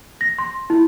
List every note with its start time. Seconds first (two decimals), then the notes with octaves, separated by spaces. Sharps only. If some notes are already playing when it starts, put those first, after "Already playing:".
0.21 A#6
0.38 C6
0.70 E4